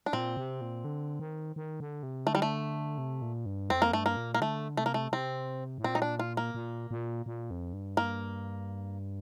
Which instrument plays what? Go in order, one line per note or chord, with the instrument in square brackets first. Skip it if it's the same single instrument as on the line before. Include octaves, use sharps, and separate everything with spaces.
[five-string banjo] D4
[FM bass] A#2 [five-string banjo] C4
[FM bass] C3
A#2
D3
D#3
D#3
D3
C3
[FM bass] D3 [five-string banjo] A3
[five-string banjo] G3
A3
[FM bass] C3
A#2
G2
[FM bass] F2 [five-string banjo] C4
[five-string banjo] A#3
[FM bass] G2 [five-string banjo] A3
[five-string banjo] A#3
[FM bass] A#2
[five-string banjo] A#3
[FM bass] D3 [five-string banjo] A3
[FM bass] C3 [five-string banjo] A3
[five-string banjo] A#3
A3
[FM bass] C3 [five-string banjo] C4
[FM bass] A2
[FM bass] A#2 [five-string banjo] C4
[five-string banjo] D#4
D4
F4
A#3
[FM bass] A#2
A#2
A#2
F2
G2
[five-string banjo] A#3